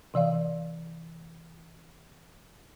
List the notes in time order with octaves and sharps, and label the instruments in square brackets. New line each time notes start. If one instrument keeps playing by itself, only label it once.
[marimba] C3 E3 D5 F5